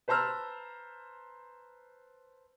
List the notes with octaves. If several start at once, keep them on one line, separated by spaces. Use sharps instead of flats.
B4 C5 A5 A#5 E6 F6